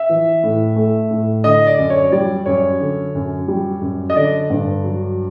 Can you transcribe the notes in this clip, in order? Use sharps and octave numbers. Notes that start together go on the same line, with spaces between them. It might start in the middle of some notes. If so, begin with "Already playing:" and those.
Already playing: E5
E3
A2
A3
A2
D3 D#5
D5
F#2
C#5
G3 D5
F#2 C#5
D3
F#2
G3
F#2
D#5
D3 D5
G2
F#3